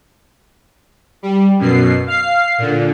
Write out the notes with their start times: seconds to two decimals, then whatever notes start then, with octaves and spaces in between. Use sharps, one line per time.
1.23 G3
1.59 F#2 B2 C7
2.07 F5 C7
2.58 A#2 D3